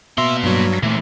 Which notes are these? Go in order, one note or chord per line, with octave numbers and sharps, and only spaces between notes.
B2 A#3 E5 C6
G2 F#3
A#2 E3 A3 C4